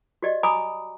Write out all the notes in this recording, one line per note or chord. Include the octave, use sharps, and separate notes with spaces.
F#4 G4 D5 D#5
G#5 A#5 B5 D6 D#6